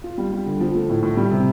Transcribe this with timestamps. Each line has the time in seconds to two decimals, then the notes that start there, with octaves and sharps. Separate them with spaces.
0.04 F4
0.18 G3
0.32 G3
0.46 D3
0.60 F3
0.75 A3
0.89 A2
1.02 A2
1.17 G3
1.31 C3